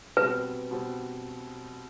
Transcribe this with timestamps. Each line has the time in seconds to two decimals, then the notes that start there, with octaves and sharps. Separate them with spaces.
0.17 B2 G3 C4 B4
0.71 B2 G3 C4